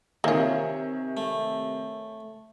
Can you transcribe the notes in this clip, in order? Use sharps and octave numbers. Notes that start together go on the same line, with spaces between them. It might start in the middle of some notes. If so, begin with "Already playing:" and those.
C3 D#3 A#3 F4 C#5 E5 G#5
A3